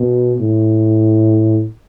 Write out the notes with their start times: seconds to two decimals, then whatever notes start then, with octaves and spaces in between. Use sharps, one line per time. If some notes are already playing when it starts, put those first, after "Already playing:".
Already playing: B2
0.40 A2